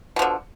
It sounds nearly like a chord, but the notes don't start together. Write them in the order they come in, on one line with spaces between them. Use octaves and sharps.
B2 F3 D3